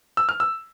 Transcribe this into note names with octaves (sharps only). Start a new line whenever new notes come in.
E6
F6
E6